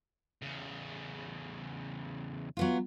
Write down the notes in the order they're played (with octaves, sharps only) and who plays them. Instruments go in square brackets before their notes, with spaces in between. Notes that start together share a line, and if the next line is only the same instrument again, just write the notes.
[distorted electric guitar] E2 C#3
[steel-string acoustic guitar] F#3 B3 F4